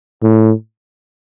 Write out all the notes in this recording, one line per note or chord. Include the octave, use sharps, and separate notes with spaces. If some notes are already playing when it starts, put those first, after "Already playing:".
A2